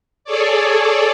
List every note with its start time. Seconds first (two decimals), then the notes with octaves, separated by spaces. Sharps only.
0.24 G#4 A4 C#5 D5